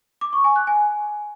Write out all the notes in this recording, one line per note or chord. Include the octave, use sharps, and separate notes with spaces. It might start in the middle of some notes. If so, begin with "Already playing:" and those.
D6
C#6
G#5
F#6
G#5